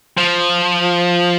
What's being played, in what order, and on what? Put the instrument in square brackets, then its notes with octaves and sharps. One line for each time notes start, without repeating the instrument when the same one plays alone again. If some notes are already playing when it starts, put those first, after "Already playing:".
[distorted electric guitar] F3